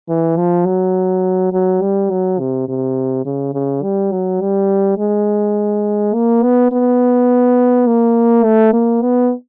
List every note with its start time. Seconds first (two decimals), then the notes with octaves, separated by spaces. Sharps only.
0.08 E3
0.37 F3
0.66 F#3
1.53 F#3
1.81 G3
2.10 F#3
2.39 C3
2.68 C3
3.25 C#3
3.54 C#3
3.83 G3
4.12 F#3
4.41 G3
4.98 G#3
6.14 A#3
6.43 B3
6.72 B3
7.87 A#3
8.44 A3
8.73 A#3
9.02 B3